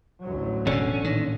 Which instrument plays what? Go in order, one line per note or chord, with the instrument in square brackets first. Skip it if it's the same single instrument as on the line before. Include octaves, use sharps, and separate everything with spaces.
[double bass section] A1 D2 F#3
[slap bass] E1 B2 [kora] D3 [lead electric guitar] C#4
[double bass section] A1 A#2 [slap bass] D#3